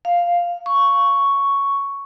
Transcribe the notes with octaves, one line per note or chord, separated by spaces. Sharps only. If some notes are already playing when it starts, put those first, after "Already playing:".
F5
C#6